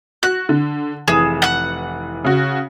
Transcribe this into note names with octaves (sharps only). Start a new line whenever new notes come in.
F#4 F#6
D3
F1 E3 G#4 E7
F#5 F#6
C#3 F#4